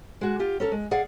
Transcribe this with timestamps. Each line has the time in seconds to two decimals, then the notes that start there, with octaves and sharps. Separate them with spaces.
0.21 G#3 F#4
0.39 F4 G4
0.60 C#4 A4 A#4
0.72 G#3
0.91 G#4 D5 F5 F#5